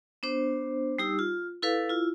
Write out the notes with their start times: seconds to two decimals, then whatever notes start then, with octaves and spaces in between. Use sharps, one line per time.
0.23 B3 D4 C5
0.99 G3 D#4 G4 E6
1.19 F4
1.62 E4 A4 B4 F5
1.90 E4 F4